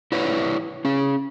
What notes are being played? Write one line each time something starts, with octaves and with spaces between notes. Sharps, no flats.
E4 B4 C#5 D5
C#4 G#4